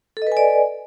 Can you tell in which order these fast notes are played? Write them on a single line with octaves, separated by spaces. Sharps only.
A4 D#5 B4 G#5 D5